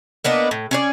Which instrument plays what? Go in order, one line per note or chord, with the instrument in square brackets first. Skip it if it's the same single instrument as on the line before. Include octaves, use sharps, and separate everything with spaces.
[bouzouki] A#3 B3 D4 D#5
A2
C#4 G#4 D5